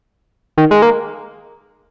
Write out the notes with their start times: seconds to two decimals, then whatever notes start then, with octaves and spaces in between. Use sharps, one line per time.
0.57 D#3
0.71 G#3
0.82 A#3